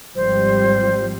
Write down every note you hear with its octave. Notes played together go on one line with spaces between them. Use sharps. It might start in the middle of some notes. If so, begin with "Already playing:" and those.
G#1 F3 G3 C5